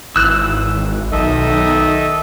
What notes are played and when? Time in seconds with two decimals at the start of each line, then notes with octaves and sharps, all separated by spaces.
0.16 G#1 E3 E6 F#6
1.12 B1 D#3 A4 D#5 E5